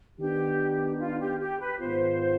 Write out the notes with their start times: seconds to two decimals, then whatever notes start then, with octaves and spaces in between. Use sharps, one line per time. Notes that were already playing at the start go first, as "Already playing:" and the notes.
0.18 D#3 B3 D4 G4
1.00 F4
1.19 G4
1.40 G4
1.60 B4
1.80 G#2 D#3 B3 F4 C5